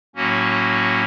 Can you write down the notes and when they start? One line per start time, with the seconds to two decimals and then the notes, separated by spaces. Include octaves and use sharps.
0.16 A2 F#3 A#3 C#4 F#4